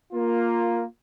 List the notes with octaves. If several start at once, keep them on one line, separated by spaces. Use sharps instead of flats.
A#3 F4